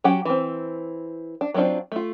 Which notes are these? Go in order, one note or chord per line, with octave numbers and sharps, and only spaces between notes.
F#3 C#4 G4 F#5
E3 C4
D4
F#3 B3 C4 D4 F4
A3 F4